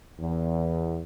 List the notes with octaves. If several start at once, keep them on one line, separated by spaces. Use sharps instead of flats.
E2